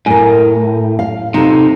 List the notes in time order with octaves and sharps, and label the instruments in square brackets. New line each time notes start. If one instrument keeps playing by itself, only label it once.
[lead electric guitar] A2 [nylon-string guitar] A#4 G#5
[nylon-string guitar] F5
[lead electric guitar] C3 [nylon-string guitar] D#4 F4 A4